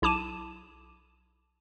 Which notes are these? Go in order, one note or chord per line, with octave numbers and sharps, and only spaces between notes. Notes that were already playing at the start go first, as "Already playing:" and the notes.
B1 E4 A5 D6 D#7 E7